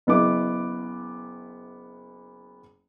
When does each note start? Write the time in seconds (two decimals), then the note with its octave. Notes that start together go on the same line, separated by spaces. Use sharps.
0.07 F#1 B3 E4 D6